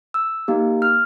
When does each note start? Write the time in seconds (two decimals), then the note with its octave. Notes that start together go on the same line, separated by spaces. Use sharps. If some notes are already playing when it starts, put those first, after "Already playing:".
0.14 E6
0.48 A#3 D#4 G4
0.82 F6